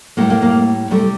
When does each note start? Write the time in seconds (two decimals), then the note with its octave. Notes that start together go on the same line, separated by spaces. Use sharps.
0.17 A2 G3 A#3
0.30 A#3
0.42 A#3
0.90 C3 G3 A3